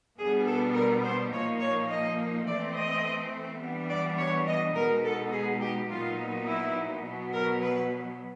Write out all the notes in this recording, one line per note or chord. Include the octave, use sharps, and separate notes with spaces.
B2 G3 B3 D4 G#4
A4
A#4
C5
A#2 F3 A#3 D#4 C#5
C#5
D#5
E3 A3 C4 D5
D#5
E3 G3 B3 D4
D5
C#5
D#5
B2 G#3 B3 D#4 A#4
A4
G#4
G4
A#2 F#3 B3 D#4 F4
E4
B2 F#3 B3
A#4
B4